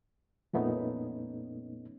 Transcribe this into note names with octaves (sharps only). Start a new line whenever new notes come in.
F2 A#2 A3 B3 C#4 D#4